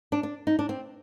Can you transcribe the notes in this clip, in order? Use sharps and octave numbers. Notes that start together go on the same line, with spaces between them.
D4
D4
D#4
D4
C4